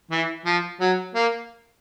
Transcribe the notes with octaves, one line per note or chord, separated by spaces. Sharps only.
E3
F3
F#3
A#3